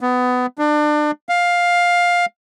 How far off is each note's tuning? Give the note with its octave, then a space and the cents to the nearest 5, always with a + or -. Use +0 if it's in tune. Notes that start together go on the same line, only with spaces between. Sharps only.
B3 +20
D4 +30
F5 +10